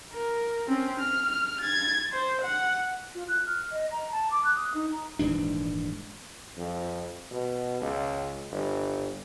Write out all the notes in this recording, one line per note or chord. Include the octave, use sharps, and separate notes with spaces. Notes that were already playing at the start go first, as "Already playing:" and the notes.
A#4
C4 C#4
F6
G#6 A6
C5
F#5
F4
F#6
F6
D#5
A#5
A5
D6
F#6
D#6
D#4
A#5
D#1 G#2 E3 D4
F2
B2
C#2
G1